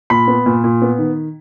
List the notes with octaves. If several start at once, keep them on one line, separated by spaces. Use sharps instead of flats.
A#2 B5
B3
A#2
A#2
B3
D#3